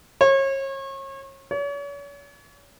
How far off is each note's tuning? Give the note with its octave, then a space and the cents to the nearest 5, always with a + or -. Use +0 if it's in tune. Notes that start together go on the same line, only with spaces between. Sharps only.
C#5 -35
C#5 +40